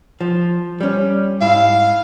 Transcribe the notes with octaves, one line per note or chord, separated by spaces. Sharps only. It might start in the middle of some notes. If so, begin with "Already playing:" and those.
F3
G3 C#4
G#2 E4 F5